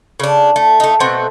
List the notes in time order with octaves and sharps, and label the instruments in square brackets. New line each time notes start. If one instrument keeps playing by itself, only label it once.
[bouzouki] C#3 D4
A3
A3 D#4
B2 A3 C4 F#5